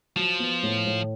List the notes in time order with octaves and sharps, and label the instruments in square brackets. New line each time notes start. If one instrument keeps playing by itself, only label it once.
[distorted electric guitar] F3 [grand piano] F#3
[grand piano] B3
A2
A2